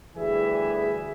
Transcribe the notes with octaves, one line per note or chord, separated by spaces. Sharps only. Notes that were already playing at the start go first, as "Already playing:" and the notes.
D2 E3 G3 G#4 E5 G#5